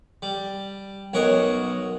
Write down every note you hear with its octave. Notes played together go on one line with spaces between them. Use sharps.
G3
B1 F#2 A#4 C#5 D#5 F#5